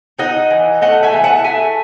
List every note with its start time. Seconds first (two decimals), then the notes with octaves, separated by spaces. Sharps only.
0.19 D#4 D#5 F#5
0.51 E3
0.81 A3 D#5 F#5
1.03 E5 G#5
1.13 E3
1.24 F#5 A5
1.44 A3 E5 G#5